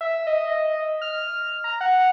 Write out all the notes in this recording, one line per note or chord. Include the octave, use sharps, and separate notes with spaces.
E5
D#5
F6
A#5
F#5